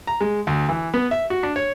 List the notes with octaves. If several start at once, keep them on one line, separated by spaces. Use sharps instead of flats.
A#5
G#3
D2
E3
B3
E5
F#4
D4
C#5